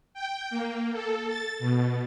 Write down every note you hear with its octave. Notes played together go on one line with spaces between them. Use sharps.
G5
A#3
A4
A6
B2